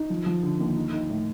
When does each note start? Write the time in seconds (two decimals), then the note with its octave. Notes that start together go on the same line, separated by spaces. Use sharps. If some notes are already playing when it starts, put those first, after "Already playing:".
Already playing: D#4
0.10 F3
0.26 F3
0.43 D3
0.60 D#2
0.76 D#4
0.93 D#4
1.09 A2